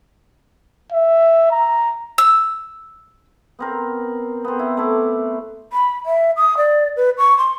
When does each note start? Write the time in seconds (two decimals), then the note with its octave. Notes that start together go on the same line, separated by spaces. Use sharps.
0.92 E5
1.51 A#5
2.18 E6
3.59 B3 C4 A#4
4.45 B3 C4
4.59 E4
4.77 A3 E4 D6
5.73 B5
6.06 E5
6.37 D#6
6.57 D5
6.97 B4
7.18 C#6
7.38 C6